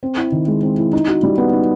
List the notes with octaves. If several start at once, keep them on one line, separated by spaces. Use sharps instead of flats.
C4
E4
D#3
G#3
C4
E4
D#4
F#4
G3
B3
D#4